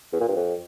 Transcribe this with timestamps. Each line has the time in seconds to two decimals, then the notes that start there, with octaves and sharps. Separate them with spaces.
0.13 E2
0.20 A#2
0.28 G2
0.36 F2